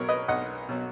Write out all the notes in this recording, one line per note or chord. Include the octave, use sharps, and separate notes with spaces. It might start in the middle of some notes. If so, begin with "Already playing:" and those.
Already playing: B1 B2 F#3 A#4 C#5
B4 D#5
B1 D#5 F#5
B2 F#3